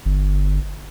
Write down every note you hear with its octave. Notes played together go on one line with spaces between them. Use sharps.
G1